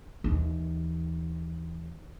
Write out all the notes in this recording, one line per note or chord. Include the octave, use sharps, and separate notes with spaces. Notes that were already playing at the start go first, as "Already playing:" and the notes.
D#2 E3